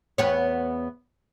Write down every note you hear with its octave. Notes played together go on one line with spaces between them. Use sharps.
E2 B3 C#5